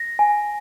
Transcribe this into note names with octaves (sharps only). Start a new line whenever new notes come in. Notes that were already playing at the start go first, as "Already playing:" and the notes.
Already playing: A#6
G#5